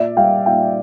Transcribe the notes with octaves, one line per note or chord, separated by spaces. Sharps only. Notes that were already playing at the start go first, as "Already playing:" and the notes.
Already playing: A#2 D5 E5
G3 F5 G5
A#2 F5 G5